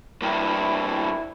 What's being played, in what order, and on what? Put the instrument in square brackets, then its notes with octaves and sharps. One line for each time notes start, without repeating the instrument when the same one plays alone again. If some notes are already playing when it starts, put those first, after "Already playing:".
[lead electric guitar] G2 A#3 [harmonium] E4 [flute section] G5 B5